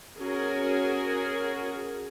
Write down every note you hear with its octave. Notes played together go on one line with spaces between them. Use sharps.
C#4 F#4 G#4 A#4